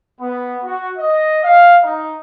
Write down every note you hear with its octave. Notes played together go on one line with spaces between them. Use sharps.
B3
F#4
D#5
F5
D#4